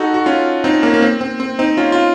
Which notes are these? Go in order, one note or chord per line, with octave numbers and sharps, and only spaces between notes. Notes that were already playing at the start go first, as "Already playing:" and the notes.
Already playing: D#4 F#4 A4
F#4
C#4 F4
C4 D#4
A#3 C#4
A#3
C4
C4
C4
C4 D#4
C#4 F4
F4